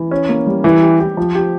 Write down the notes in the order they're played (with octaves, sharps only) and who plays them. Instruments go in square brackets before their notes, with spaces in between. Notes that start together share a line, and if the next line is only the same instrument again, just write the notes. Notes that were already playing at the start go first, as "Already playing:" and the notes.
Already playing: [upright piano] E3
C#4
A#3
G3
[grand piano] E3 [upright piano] G3
[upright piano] G4
G4
F3
G4